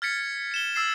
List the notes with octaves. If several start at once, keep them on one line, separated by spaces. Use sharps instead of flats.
F6 G#6 A6 B6 C#7
C#7 E7 G7
E6 A6 C7 E7